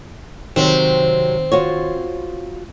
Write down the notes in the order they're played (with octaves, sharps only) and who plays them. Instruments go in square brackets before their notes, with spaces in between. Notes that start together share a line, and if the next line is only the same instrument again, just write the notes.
[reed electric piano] C2 D#3 [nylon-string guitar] C3 F#3 [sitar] C4
[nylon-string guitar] F4 F#4 C#5